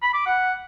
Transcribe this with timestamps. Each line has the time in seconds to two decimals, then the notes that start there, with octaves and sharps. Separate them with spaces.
0.02 B5
0.14 D6
0.26 F#5